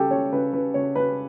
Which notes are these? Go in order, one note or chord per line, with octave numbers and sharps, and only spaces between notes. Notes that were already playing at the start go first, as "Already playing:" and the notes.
Already playing: C#3 G3 G4 A4 G5
C#3 C#5
C#3 B4
C#3 B4
C#3 C#5
C#3 B4